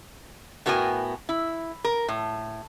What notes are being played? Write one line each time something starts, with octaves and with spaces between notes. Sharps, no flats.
A2 B3 F#4 A#4 G5 G#5
E4
A#4
A2